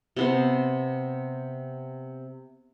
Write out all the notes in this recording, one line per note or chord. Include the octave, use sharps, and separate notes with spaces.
C3 B3 C5